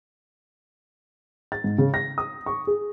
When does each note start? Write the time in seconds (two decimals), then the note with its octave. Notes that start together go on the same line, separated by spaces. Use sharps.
1.52 A6
1.64 G#2
1.78 C#3
1.94 A#6
2.18 D#6
2.46 C#6
2.67 G#4